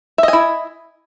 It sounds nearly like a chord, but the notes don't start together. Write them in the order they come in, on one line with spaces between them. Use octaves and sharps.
E5 D#5 G#5 E4